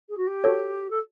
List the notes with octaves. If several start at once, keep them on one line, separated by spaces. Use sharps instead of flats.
G#4
F#4
G4
F#4 A4 C#5
A4